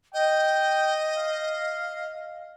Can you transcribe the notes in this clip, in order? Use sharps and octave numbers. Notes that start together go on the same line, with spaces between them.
D#5 G5
F5